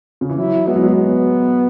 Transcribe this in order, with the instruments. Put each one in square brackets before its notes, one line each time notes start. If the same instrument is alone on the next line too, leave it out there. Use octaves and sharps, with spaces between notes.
[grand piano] C#3
E3
[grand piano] F#3 [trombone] E4
[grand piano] G#3 [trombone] B3
[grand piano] F#3
G#3
[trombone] B3